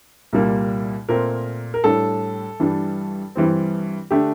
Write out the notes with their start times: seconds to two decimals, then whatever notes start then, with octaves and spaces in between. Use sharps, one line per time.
0.33 C2 A#2 G3 A#3
1.09 A#2 A3 C4 A#4
1.74 A#4
1.84 A2 G3 D4 A4
2.60 G2 E3 G3 D4
3.35 G2 E3 G3 C4
4.11 D3 A3 D4 G4